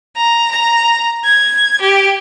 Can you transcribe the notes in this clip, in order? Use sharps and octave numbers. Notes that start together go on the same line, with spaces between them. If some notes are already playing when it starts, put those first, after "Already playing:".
A#5
A#5
G#6
G4